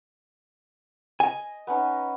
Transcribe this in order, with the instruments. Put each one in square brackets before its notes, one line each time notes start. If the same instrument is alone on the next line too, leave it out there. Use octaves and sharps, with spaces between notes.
[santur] D#5 [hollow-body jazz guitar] G#5
[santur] B3 C#4 D#4